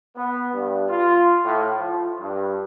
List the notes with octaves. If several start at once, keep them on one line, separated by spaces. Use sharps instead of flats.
B3
G2
F4
A2
F3
G2